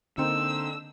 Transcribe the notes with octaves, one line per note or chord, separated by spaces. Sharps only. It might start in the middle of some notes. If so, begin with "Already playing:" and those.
D3 A#3 C4 D#4 E6